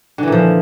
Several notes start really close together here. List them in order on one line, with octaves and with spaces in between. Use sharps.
D3 E3 A#2 F3